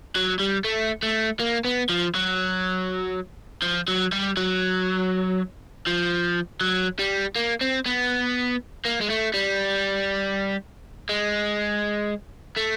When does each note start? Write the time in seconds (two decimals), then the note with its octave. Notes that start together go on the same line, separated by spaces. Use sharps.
0.16 F#3
0.40 G3
0.65 A3
1.03 A3
1.40 A#3
1.65 B3
1.89 F3
2.15 F#3
3.62 F3
3.88 F#3
4.12 G3
4.37 F#3
5.87 F3
6.61 F#3
6.99 G3
7.36 A#3
7.61 C4
7.86 B3
8.85 A#3
9.02 G#3
9.10 A3
9.34 G3
11.09 G#3
12.57 A3